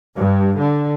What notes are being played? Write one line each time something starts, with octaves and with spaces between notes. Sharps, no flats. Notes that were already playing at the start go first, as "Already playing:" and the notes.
G2
D3